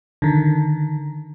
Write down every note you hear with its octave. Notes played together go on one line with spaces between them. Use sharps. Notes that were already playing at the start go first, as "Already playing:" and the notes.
D3 D#3